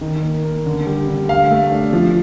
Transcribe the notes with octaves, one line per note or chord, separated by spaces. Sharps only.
D#3
A#3
A#3
D3
G3
D3
A3 F5
A3
D4
F3